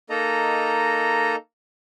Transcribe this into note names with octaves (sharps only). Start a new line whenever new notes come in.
A#3 D#4 A4 D#5 A#5